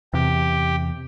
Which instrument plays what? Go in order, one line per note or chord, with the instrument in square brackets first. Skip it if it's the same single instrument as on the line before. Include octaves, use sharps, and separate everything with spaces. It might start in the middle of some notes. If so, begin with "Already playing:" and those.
[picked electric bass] E2 C3 [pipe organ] G4